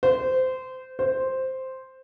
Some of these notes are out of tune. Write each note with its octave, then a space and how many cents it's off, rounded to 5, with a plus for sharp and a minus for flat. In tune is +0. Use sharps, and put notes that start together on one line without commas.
C5 -20
C5 +0